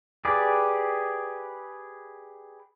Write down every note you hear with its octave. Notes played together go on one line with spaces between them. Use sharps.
G4 G#4 B4 D5